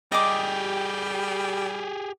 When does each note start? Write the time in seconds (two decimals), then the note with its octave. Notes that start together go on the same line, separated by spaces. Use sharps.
0.12 G3 G4 G#4 D#5 D6